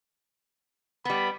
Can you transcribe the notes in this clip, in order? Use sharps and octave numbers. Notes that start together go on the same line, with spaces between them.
G3 B3 B5